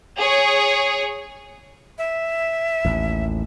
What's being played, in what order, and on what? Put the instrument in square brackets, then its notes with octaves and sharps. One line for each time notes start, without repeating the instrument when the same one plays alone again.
[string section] G#4 C#5
[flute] E5
[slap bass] A1 D#2